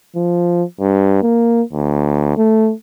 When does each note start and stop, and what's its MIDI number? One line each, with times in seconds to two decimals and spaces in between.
0.16 0.64 53
0.81 1.20 43
1.23 1.62 58
1.73 2.35 38
2.37 2.73 57